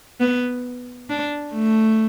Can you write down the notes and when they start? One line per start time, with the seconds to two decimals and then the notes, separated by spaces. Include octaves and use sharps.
0.20 B3
1.10 D4
1.53 A3